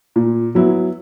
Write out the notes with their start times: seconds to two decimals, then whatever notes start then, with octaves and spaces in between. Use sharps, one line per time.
0.16 A#2
0.55 F#3 B3 E4